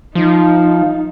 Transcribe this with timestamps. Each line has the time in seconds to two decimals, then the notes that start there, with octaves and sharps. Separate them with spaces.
0.15 F3 D#4